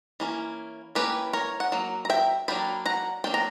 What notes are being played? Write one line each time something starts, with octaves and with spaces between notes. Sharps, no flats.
E3 A#3 C#4
E3 A#3 C#4 G4 B4
A#4 C#5
F#5
F#3 A#3
A#5
E5 G5
F#3 A#3 D4 G5 B5
F#5 A#5
F#3 A#3 D4 G5
A#5